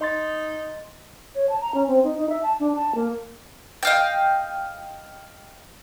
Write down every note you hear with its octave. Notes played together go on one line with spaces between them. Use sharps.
D#4 D#5 C6 A6
C#5
A5
A#5
C#4
C4
D#4
D#4
E5
A5
D4
A5
A#3
D#5 F5 G5